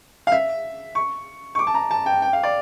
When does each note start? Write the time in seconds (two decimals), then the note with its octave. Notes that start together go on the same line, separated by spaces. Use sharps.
0.27 F5
0.32 E5
0.95 C#6
1.55 C#6
1.59 D6
1.67 A5
1.74 A#5
1.91 A5
2.06 G5
2.22 G5
2.33 F5
2.43 D5